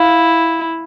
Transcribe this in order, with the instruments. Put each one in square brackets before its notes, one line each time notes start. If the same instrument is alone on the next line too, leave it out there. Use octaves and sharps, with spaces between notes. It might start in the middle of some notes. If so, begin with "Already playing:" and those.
Already playing: [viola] E4 [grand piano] F5